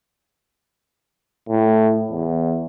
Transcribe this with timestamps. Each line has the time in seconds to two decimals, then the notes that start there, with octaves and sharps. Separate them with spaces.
1.49 A2
2.11 E2